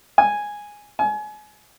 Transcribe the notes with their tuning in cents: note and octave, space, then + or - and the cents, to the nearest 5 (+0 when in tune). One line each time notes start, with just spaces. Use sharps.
G#5 -5
G#5 +30